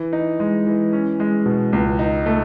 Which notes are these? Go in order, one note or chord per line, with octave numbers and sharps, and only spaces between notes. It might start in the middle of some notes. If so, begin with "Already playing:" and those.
Already playing: E3
D#4
G#3
E3
C#4
G#3
B2
C#2
D#4
A3